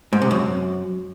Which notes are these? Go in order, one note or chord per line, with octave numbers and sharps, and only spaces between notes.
G#2
C3
F#2